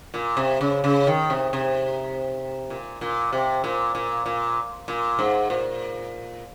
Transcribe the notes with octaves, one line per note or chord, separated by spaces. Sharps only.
A#2
C3
C#3
C#3
D#3
C3
C3
A#2
A#2
C3
A#2
A#2
A#2
A#2
G#2
A#2